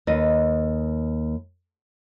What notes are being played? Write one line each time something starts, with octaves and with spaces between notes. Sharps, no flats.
D#2 B4 D#5